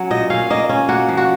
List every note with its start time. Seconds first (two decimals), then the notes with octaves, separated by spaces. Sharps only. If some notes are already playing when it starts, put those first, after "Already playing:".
Already playing: F#3 C#4
0.10 A#2 D#5
0.30 C#4 F5
0.50 A#3 D#5
0.69 C#4
0.89 A#3 F#4
1.09 F3
1.17 F#4